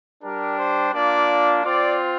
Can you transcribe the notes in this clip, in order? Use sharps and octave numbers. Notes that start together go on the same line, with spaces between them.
G3 D4 G4 A#4
C5
A#3 D4 F4 D5
C4 F4 D5